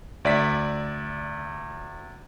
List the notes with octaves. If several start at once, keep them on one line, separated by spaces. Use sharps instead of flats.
D2 D5 E5 B6